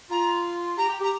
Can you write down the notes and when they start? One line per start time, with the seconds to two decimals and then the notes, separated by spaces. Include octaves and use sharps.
0.10 F4 A#5
0.77 G4 A#5
0.88 G4
1.00 G4 A#5